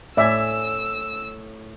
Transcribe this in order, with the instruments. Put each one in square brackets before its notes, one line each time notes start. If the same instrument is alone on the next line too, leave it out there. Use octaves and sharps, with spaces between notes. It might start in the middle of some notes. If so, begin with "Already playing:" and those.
[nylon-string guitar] A2 G#5 [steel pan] D5 E5 [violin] E6